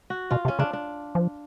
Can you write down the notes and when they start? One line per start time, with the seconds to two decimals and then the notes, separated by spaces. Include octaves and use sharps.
0.10 F#4
0.31 B2 F4
0.45 C3
0.48 C#4
0.59 C#3 D4
0.73 D4
1.15 F3